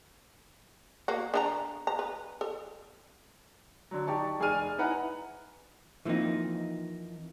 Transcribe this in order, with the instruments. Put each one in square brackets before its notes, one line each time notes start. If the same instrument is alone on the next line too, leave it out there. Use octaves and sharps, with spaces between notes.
[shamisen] A#3 F#4
D3 D#4 A#5
A#5
B4
A4
[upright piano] D3 F#3
D#4 G4 D5 A5 C#6
F1 G#4 D5 G#5 F6 D#7
D#4 E4 B4 F#5 G#5 A#5
[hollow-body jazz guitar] E3 F3 A#3 C4 D#4